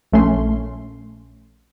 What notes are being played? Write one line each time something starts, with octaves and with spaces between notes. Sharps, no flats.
A#1 A3 C#4 C6